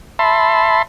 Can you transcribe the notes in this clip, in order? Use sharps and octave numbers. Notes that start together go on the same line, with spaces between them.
E5 A5 B5 C6